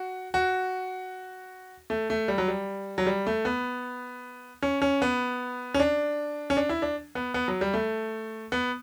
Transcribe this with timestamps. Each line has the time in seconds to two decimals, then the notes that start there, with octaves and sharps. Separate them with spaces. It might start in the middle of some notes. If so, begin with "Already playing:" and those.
Already playing: F#4
0.34 F#4
1.90 A3
2.10 A3
2.28 G3
2.38 F#3
2.48 G3
2.98 F#3
3.06 G3
3.27 A3
3.45 B3
4.62 C#4
4.82 C#4
5.02 B3
5.74 C#4
5.80 D4
6.50 C#4
6.57 D4
6.69 E4
6.82 D4
7.15 B3
7.34 B3
7.48 F#3
7.61 G3
7.74 A3
8.52 B3